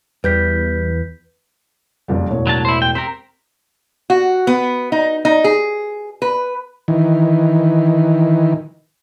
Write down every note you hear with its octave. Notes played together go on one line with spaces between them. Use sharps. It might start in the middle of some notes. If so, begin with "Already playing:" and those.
E2 G3 B4 G6 B6
F#1 F2 G3
E1 A2 C#5
F#3 D4 A5
E4 C5
G5
C4 G4 A#4 B6
F#4
B3
D#4
D#4
G#4
B4
D#3 E3